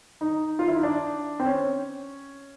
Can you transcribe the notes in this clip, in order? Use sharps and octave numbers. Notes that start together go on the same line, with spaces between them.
D#4
F4
E4
D#4
D4
C4
C#4